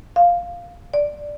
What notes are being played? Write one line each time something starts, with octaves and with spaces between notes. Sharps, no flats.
F5
D5